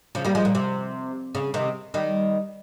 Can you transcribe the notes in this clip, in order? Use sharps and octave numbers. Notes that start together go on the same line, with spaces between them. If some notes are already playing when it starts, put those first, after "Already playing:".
C#3 F3
G3 A#3
F3 G#3
A#2
C3
C#3
C3 D#3
D#3 G3